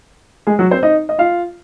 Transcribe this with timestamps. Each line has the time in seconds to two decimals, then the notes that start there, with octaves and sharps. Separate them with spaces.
0.47 G#3 G#4
0.59 F#3 F#4
0.71 C4 C5
0.83 D#4 D#5
1.09 D#5
1.19 F4 F5